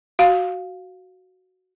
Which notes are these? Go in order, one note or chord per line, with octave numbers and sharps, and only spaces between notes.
F#4 F5